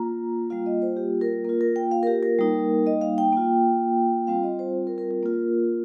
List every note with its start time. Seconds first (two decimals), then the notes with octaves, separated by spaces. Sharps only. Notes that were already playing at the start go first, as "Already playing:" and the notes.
Already playing: A#3 F4 A#5
0.50 G3 A#3 F4 F5
0.66 D#5
0.82 C5
0.97 G4
1.21 A#4
1.44 A#3 F4 A#4
1.61 A#4
1.76 G5
1.91 F5
2.03 A#4
2.07 G4
2.23 A#4
2.39 G3 A#3 D#4
2.87 D#5
3.01 F5
3.18 G5
3.33 A#3 F4
4.27 G3 C4 F4 F5
4.43 D#5
4.59 C5
4.87 A#4
4.98 A#4
5.11 A#4
5.23 A#3 F4